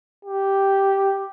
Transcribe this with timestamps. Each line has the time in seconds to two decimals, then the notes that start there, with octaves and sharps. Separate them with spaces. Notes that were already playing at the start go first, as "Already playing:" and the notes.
0.25 G4